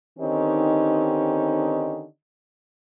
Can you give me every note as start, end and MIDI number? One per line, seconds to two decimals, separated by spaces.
0.19 2.05 50
0.19 2.05 51
0.19 2.05 60
0.19 2.05 61
0.19 2.05 63
0.19 2.05 67